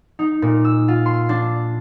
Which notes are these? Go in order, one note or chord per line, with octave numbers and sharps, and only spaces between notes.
D#4
A#2
E6
F4
C6
D4